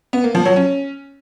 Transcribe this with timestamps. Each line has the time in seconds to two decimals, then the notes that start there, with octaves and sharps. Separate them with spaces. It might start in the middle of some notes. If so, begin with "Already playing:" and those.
0.13 B3
0.24 A#3
0.35 F3
0.45 F#3
0.56 C#4